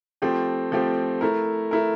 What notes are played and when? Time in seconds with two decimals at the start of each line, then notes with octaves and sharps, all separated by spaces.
0.22 F3 A3 C4 G4
0.72 F3 A3 C4 G4
1.21 A3 E4 A#4
1.71 A3 E4 A#4